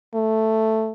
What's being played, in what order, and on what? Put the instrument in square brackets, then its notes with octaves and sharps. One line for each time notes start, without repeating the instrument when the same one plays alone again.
[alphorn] A3